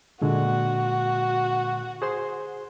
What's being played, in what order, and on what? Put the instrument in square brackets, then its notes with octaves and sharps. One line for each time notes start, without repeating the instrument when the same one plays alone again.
[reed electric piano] A#2 D3 G#3 [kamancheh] F#4
[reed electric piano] G#4 C5 C6